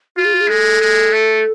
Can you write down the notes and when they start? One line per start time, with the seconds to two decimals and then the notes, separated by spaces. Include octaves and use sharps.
0.16 F4 F#4
0.25 G#4
0.34 F#4
0.40 G#4
0.48 G#3 A4
0.81 G#3
1.13 A3